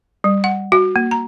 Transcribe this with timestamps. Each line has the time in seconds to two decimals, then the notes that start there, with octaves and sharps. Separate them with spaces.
0.24 G3
0.44 F#5
0.72 F#4
0.96 A#3
1.11 A#5